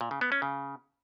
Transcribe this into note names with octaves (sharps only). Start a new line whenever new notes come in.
A#2
C#3
B3
C#4
C#3